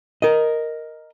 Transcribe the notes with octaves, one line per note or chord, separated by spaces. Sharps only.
A#4 D#5